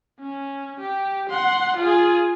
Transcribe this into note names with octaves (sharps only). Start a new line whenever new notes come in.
C#4
G4
F#5 C6
F4 G#4